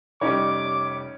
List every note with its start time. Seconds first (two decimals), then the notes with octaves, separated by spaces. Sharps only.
0.21 F1 G3 C#4 D#4 C#5 D6